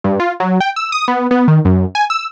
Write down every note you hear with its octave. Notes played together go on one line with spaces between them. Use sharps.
G2
F4
F#3
G5
E6
D#6
B3
B3
D#3
F#2
G#5
E6